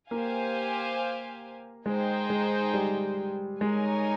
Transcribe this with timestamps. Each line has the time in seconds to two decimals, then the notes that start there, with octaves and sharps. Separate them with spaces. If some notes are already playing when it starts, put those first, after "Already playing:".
0.10 A#3 G4 C5 F5 G#5
1.86 G#3 D#4 G#4 C5 G5
2.30 G#3
2.74 G3
3.61 G#3 D#4 A#4 C#5 G#5